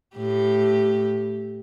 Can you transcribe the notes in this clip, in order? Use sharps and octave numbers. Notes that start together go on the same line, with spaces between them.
A2 G4